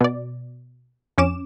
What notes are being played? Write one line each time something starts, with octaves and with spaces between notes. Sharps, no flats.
B2 D5
F2 C#4 D6 E7